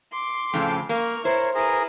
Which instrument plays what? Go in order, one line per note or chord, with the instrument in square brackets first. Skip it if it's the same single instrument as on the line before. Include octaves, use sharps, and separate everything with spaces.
[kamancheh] C6 D6
[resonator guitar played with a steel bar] F2 A2 C#3 [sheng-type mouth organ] A4 G5
[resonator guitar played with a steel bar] A#3 [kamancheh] A#5 C#6 [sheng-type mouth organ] F6
[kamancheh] E4 [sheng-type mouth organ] A#4 C#5 [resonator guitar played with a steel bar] C5
[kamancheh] E4 B4 [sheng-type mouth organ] G#4 A#4 A#5